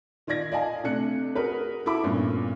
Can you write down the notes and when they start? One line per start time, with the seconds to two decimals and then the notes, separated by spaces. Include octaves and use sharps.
0.27 D#3 F4 D5 G#6 A#6
0.52 D5 D#5 F5 G#5 A5
0.84 C3 A3 D4 F#6 C#7
1.35 F#4 G#4 A#4 B4
1.86 E4 F#4 A4 E5 B5 D6
2.03 G2 A#2 B3 C#4